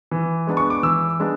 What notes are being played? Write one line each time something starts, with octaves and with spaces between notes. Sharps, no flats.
E3
G#3 B3 D4
C#6
D6
E3 E6
G#3 B3 D4